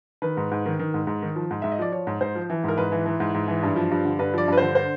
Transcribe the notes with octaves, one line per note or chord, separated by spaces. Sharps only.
D#3 B4
G#2
G#2
D#3
D#3
G#2
G#2
D#3
F3
G#2
G#2 E5
D#5
F3 D5
F3 C#5
G#2
G#2 C5
F3
E3
G#2 A#4
G#2 B4
E3
E3
G#2
G#2
E3
G2
F3
G2
D3
G2 B4
F3 D5
G2 B4
D3 C5
C5